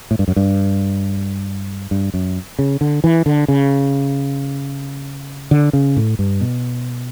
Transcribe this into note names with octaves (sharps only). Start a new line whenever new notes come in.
A2
G2
F#2
G2
G2
F#2
C#3
D3
E3
D3
C#3
D3
C#3
A2
G2
B2